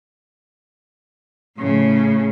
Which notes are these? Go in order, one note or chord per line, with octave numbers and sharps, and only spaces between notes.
A2 C#3